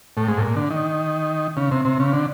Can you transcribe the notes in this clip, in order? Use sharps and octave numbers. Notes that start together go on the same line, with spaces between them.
A2
G#2
A2
A#2
D3
D#3
C#3
C3
C3
C#3
D3